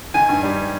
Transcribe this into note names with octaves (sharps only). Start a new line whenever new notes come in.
D#3 G#5
G2
G3